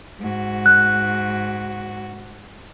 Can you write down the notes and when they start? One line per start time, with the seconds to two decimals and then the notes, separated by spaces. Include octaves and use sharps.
0.19 G#2 F#4
0.66 F#6